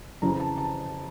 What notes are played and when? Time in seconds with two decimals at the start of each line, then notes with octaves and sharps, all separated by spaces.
0.22 F2 C#3 E3 A#5
0.40 A5
0.58 A5